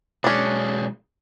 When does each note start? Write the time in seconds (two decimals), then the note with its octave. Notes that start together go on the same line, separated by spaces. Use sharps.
0.24 B1 G#3 C#4 D4